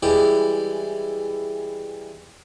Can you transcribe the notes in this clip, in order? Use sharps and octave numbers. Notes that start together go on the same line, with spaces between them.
E3 G3 G#3 E4 G4